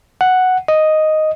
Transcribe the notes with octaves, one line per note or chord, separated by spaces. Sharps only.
F#5
D#5